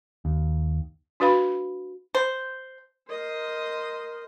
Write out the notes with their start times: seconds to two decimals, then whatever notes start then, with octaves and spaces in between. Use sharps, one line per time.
0.25 D#2
1.20 D4 F#4 B4 F5 B5
2.15 C5
3.10 A#4 C5 D#5